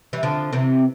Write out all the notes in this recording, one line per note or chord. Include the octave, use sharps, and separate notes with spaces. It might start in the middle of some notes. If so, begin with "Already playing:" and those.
E3 G3
D3 F3
C3 E3